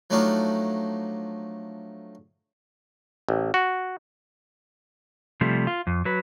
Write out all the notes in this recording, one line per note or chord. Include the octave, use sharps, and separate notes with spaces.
F3 F#3 A3 D4 D#4 F4
A1
F#4
C3 F3 G3 A3
F4
F2
F#3 B4